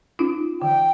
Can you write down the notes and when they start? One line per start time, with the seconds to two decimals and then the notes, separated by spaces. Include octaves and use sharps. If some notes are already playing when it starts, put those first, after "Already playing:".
0.19 C#4 D#4 F4
0.62 D3 E3 G5